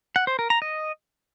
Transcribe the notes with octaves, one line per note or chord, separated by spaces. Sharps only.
F#5
C5
A#4
A#5
D#5